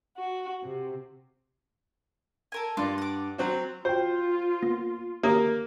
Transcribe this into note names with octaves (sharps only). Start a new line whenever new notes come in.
F#4
C3
A4 A#4 G#5
G2 F4 D5
F#5 D6
F#3 C4 F#4
F4 F#4 C5 G5
A#3 B3 A#6
A#3 G4 C#5 D#6